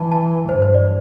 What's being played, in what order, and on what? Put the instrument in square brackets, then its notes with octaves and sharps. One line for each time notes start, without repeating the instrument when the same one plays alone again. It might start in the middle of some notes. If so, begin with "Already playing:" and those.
Already playing: [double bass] E3 [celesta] A5
[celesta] A5
[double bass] G2 [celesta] C5
[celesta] C5
D5